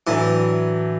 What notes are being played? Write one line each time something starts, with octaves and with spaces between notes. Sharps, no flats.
A2 E3 F#3 A3 D4